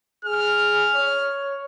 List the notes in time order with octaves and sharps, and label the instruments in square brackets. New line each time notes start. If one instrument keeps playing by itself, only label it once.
[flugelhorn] G#4 [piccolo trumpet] F6
[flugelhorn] C#5